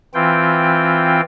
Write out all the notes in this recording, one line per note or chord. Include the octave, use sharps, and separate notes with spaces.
E3 C4 F4 G5